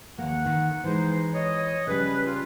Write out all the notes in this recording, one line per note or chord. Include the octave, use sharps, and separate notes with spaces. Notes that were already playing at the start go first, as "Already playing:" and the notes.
D#2 A#3 F#5
D#3
E3 G#3 D#4 C5
C#5 D#5
C#3 G3 B4
F4